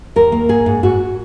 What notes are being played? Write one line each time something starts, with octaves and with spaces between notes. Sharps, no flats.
D#2 A#4
A#3
G#2 G#4
G#2
G#2 F#4